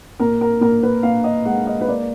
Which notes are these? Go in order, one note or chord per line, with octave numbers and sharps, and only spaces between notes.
A#2 A#4
A#4
A#2 A#4
B4
A#2 F5
D#5
G#3 F#5
D#5
B4
A#3 D5